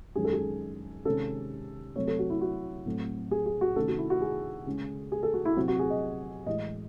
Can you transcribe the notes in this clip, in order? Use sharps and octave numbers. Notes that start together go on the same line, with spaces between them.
F#2 D#3 G#3 C#4 G#4
A4
G#4
C3 D#3 G#3 C#4 A4
C3 F#3 A3 C4 C#5
A4
F#4
E4
F#4
A2 F#3 A3 C4
G#4
G#4
F#4
C3 D#3 A3 C#4 A4
F#4
E4
F#4
G#4
C#3 G#3 C#4
G#4
A4
F#4
E4
C3 F#3 C4 F#4
F#4
G#4
D#5
A2 E3 G#3 D#5